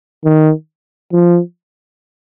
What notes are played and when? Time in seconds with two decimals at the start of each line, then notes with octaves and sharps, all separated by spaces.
0.25 D#3
1.13 F3